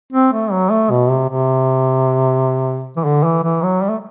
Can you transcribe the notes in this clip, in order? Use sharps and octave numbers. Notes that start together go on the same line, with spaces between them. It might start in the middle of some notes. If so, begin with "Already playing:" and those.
C4
A3
F#3
A3
B2
C3
C3
E3
D3
E3
E3
F#3
G3
A3